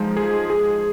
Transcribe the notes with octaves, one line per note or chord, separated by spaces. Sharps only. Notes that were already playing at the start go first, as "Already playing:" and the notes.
Already playing: F3 G#3 D#4
G#4
G#4